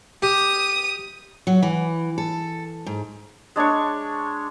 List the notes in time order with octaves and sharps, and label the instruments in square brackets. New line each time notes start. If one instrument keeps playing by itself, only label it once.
[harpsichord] G4 [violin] D#6
[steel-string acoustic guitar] F#3
E3
A4
G#2
[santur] G#3 D4 C#5 C#6